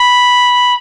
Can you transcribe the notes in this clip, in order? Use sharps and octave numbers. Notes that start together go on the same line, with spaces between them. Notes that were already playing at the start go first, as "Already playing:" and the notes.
Already playing: B5